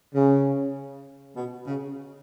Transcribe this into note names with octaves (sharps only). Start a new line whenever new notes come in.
C#3
B2
C#3